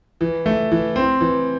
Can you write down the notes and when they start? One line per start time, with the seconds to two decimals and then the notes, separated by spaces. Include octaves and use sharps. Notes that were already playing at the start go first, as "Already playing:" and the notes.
0.21 E3
0.46 A3
0.71 E3
0.96 C4
1.21 E3